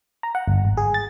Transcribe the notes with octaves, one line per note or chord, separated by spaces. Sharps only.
A#5
F#5
G1
G#1
G#4
A6